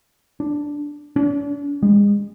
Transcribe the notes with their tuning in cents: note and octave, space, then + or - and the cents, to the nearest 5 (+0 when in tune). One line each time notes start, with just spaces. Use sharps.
D4 -5
D4 -45
G#3 -35